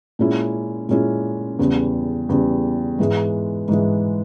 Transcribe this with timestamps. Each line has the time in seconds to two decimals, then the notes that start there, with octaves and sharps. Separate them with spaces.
0.19 A#2 G#3 C#4 E4
0.89 A#2 G#3 C#4 E4
1.59 E2 C#3 G3
2.29 E2 C#3 G3
2.99 G#2 E3 G#3
3.68 G#2 E3 G#3